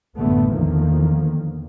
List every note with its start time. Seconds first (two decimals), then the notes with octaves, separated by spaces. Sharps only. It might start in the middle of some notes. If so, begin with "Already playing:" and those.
0.16 A1 F#2 A2 D3 A3 B3
0.52 E2 D3 D#3 F3 A#3